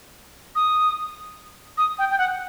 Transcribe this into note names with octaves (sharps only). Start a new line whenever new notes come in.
D#6
D#6
G5
G5
F#5